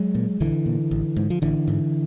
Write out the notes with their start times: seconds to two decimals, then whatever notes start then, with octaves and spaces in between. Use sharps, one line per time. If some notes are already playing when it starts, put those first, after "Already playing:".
Already playing: F#3 G#3
0.15 A#2
0.40 A#1 D3 E3
0.66 A#2
0.91 A1
1.17 G#2
1.30 F3
1.42 A1 D3 E3
1.68 G#2